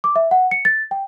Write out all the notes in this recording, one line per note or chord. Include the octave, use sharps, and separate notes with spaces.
D6
E5
F#5
C#7
A6
G5